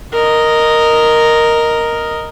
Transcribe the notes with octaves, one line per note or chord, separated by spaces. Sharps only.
A#4 D#5